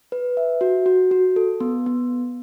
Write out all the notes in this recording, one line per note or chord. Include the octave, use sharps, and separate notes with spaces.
B4
E5
F#4
F#4
F#4
A4
B3
B3